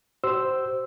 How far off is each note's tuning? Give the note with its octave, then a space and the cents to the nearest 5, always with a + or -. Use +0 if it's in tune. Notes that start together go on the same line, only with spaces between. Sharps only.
G4 -45 C5 +0 E6 +0